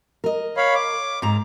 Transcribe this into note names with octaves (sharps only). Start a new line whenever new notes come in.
A#4 D#5
C#5 F5 B5
D6
G#2 A#5